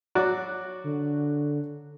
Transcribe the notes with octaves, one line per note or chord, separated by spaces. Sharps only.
F#3 F#4 D5
D3